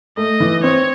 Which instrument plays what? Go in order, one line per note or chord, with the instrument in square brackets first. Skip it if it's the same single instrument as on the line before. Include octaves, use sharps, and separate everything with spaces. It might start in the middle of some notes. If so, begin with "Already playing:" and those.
[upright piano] A3 [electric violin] D#5
[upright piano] E3
[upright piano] C4 [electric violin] C#5